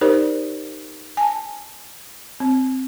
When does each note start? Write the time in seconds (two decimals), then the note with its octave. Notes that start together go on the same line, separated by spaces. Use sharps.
0.01 D#4 G4 A#4 C5 D5
1.17 G#5 A5
2.40 C4